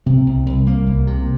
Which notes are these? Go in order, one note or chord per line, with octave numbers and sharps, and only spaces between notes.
C3 C4
C2
C2
C2 A#3
C2
C3